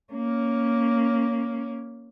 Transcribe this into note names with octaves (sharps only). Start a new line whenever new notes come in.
A#3 C#4